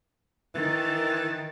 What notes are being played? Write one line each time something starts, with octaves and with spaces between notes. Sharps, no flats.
D#3 E3 A6